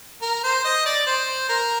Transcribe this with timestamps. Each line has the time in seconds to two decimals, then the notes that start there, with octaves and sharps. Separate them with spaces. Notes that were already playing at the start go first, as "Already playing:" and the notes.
0.22 A#4
0.44 C5
0.64 D#5
0.86 D5
1.07 C5
1.49 A#4